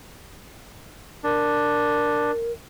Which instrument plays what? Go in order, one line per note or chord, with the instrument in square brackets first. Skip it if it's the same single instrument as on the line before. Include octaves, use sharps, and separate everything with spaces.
[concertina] D4 [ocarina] A#4